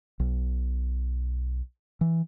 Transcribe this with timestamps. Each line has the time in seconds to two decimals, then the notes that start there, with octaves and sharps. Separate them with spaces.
0.20 B1
2.01 E3